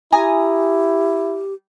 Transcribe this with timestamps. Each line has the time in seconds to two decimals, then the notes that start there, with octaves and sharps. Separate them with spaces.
0.12 E4 G4 G#5 A#5 D#6